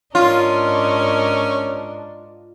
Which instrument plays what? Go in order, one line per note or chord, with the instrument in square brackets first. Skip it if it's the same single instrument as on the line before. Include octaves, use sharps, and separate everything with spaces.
[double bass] G#2 D4 [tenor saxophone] C#4 [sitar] F4 [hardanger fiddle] A#4 D#5